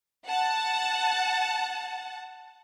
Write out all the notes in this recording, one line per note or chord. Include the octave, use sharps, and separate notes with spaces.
F#5 A5